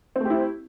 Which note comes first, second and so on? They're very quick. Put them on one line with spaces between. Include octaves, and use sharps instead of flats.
C4 A3 G4 E4